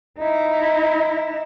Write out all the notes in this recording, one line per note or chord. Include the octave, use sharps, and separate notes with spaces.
D#4 E4